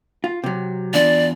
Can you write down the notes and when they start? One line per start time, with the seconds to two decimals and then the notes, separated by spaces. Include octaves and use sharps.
0.24 F4
0.44 C3 F#3
0.94 E2 D4 F4 D5